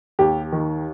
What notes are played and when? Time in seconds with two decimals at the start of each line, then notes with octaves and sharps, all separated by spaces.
0.19 D#2 G4
0.52 D#3